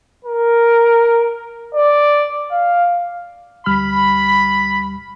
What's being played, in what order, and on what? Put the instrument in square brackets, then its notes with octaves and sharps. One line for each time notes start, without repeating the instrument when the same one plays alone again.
[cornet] A#4
D5
F5
[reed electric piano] D2 G3 F6 [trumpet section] B5